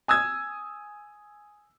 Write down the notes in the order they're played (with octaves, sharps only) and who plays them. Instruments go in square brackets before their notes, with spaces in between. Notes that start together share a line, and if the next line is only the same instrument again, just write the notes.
[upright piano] G#5 D#6 E6 G#6